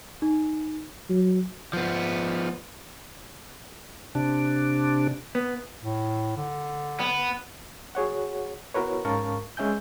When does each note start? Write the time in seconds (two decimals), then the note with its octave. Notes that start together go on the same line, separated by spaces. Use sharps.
0.22 D#4
1.10 F#3
1.73 F3 B3
4.15 C3 D4
5.35 B3
5.83 A2
6.37 D3
7.00 B3
7.95 F#4 G#4 C#5 F#5
8.74 B3 E4 F#4 A#4 B4 C#5
9.05 G#2 C#4 A#4 F5 A5 C#6
9.57 G#3 C#4 E5 G#5 G6